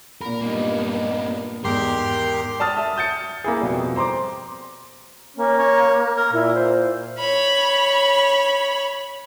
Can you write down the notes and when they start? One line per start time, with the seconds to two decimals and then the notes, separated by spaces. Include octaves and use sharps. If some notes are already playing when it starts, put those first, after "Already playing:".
0.21 A#2 A#4 B5
0.41 G2 G3 A#3 B3 D#4
1.64 E2 G#2 D#3 G4 A#4 C6
2.60 D5 A5 D#6 F6 A6
2.77 E5 D#6
2.97 D#6 G6 A6 C#7
3.44 A#3 E4 G#4
3.61 F2 B2 G3
3.96 C5 A#5 C6 D6
5.37 A#3 C#4
5.58 C#5
6.17 A#4
6.33 A#2 E4
6.55 C5
7.19 C#5 B5